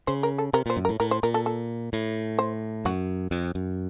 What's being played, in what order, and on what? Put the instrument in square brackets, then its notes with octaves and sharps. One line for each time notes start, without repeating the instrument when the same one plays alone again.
[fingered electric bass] C#3 [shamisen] C5
[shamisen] A#4
A4
[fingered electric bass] C3 [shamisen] A#4
[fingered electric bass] A#2 [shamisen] C5
[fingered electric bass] F#2
[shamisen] A#4
[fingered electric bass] A2
[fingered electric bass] A2 [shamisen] A#4
[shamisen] C5
[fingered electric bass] A#2 [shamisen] A#4
[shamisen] A4
A4
[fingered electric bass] A2
[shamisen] C5
[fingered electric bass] F#2 [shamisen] F#4
[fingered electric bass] F2
F#2